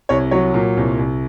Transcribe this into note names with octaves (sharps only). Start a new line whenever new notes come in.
C2 C#5
F#3 C#5
A#2
C2
C2